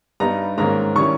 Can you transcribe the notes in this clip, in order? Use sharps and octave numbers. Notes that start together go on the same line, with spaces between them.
G2 G3 B3 D#4 A#5
G#2 D#3 A#3 C#4 A#5
D#3 G3 C#4 E4 C#6